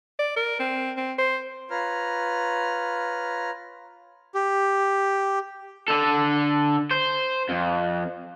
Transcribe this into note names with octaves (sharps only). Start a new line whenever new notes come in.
D5
A#4
C4
C4
C5
F4 B4 C#5 A#5 F6
G4
D3 A4
C5
F2